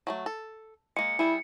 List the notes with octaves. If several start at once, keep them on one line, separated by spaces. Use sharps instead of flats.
F#3 G#3 A3
A4
G#3 A#3 C#7
G3 E4 G#4